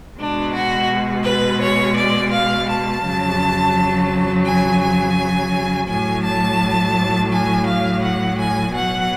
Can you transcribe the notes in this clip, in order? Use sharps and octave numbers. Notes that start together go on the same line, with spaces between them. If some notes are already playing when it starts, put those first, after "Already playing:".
B2 G#3 D4
F#4
B4
C#5
D5
F5
A5
F2 C#3 F#3
G#5
G#5
A2 F#3 G#5
A5
G#5
F5
F#5
G#5
B2 F#3 F#5